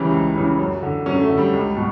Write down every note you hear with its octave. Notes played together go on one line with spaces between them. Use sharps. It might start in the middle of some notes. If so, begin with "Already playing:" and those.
Already playing: C#2 C#3 E3 G3 C#4
C#2
C#3 E3
F#2
D3
F#2 C#4
A3
D3
G3
C#2
B2